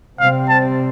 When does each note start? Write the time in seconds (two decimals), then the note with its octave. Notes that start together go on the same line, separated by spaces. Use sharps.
0.20 C3 G3 C4 F5
0.49 A5